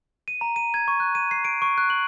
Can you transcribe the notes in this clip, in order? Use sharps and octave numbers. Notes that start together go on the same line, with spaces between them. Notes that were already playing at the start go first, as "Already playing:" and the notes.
D#7
A#5
D#7
G#6
C#6
F#6
D#7
C7
D7
C#6
F#6
F#7